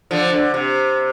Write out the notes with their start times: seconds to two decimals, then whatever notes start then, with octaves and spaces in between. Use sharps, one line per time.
0.11 D3 F3
0.32 D3
0.54 C3